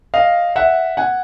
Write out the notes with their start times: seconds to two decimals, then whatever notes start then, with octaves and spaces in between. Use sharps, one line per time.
0.14 D#5 F5
0.56 E5 F#5
0.97 F#5 G#5